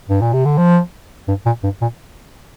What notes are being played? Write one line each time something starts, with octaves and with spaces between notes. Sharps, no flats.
G2
A#2
C3
D3
F3
G2
A#2
G2
A#2